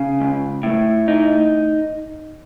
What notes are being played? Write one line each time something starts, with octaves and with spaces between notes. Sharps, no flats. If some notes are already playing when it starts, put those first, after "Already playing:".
Already playing: C#3
C#2
A2
D#4